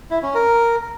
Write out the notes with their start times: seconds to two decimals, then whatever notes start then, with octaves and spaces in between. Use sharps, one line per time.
0.11 E4
0.23 C#4
0.35 A#4